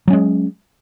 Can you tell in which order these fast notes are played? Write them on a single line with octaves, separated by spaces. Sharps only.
F#3 C#4 G#3